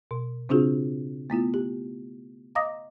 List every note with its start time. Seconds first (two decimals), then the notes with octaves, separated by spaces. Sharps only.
0.11 B2
0.49 C#3 C4 D4 F4 F#4 G#4
1.30 A3 B3 E4 F4
1.54 G4
2.55 D#5 F5 A#5 D6 D#6 A#6